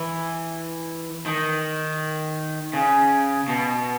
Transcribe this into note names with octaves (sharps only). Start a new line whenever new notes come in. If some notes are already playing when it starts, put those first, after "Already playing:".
Already playing: E3
D#3
C#3
B2